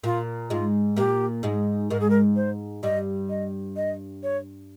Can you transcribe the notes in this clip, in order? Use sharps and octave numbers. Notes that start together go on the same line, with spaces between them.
A#2 A#3 F4
G#2 G#3 F4
A#2 A#3 G4
G#2 G#3
G#2 G#3 A#4
G#4
A#4
C5
G2 G3 D#5
D#5
D#5
C#5